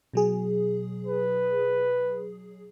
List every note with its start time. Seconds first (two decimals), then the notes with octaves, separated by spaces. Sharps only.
0.14 B2 F#3 G#4
1.06 B4